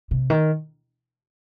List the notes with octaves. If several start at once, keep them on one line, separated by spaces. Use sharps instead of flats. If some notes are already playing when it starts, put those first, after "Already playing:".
C3
D#3